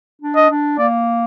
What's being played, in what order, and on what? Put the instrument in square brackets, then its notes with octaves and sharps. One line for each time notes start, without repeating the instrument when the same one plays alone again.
[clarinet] D4
[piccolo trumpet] D#5
[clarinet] D4
[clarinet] A#3 [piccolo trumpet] D5